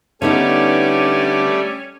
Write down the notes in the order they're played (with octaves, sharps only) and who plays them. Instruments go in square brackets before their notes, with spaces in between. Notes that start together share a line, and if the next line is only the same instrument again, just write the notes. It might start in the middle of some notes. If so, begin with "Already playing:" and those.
[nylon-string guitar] D3 B3 D#4 [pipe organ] G3 A3 D5 [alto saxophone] C#4